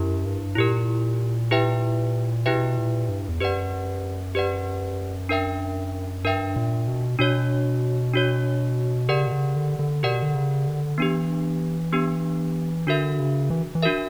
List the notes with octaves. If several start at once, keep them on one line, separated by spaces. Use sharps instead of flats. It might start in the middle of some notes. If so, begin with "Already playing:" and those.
Already playing: F#2 E4 G4 A#4
G2
A#2 E4 G4 A#4
E4 G4 B4 E5 G5
B2 E4 G4 B4 E5 G5
A#2
G2
E2
F#2 G4 B4 D5 F#5
G4 B4 D5 F#5
D4 A#4 E5 G5
G2 D4 A#4 E5 G5
A#2
B2
B2 D4 F#4 C#5
D4 F#4 C#5
C#3 G4 A#4 D5 F#5
B2
C#3
D3
D3
B2 G4 A#4 D5 F#5
D3
C#3
D3
E3 B3 D4 G4
B3 D4 G4
D3 D4 F#4 A#4 E5
C#3
E3
E3
D4 F#4 A#4 E5